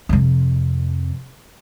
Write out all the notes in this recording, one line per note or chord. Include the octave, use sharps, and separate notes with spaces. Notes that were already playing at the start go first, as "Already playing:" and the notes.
F2 C3